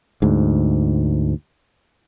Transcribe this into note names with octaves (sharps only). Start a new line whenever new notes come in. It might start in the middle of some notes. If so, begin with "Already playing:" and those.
D2 G#2